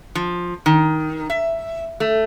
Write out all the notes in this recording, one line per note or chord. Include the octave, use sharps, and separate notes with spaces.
F3
D#3
E5
A3